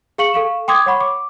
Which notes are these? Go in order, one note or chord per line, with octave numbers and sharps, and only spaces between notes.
G#4 F5 C#6 C#7 F#7
A4 F5 C#6 E7
G5 C6 D6 D#6 G#6
C#5 F#5 B5 C#6
D6